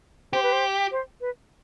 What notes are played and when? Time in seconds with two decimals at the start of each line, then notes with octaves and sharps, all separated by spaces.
0.33 G4 C5
0.43 B4
0.53 C5
0.92 C5
1.21 B4